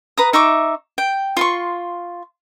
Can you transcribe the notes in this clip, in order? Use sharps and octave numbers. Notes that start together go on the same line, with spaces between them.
B4 A#5 D#6
D#4 E5 C#6 D6
G5
F4 C6 C#6